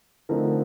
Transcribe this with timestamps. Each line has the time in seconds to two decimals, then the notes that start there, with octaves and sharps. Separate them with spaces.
0.29 D3 F3 A3 C4 D#4 A#4